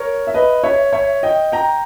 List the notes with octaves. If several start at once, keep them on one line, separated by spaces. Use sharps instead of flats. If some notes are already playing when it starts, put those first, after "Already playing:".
Already playing: A#4 C#5
E5
B4 D#5
C#5 E5
C#5 E5
D#5 G5
G5 A#5